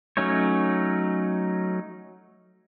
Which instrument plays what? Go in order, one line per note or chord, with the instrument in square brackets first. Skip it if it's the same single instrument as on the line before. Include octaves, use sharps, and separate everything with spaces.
[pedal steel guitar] F#3 A3 C#4 D#4 C#5